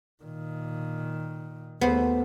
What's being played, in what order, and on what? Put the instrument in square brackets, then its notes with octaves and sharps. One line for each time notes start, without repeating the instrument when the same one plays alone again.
[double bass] A#2 D#3
[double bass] D#2 A3 [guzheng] B3 C5